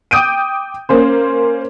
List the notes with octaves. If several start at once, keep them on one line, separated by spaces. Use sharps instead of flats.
G5 D6 D#6 G6 D7 D#7
A#3 C#4 C5